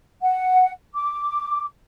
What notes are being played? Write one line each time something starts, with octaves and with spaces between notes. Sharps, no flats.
F#5
D6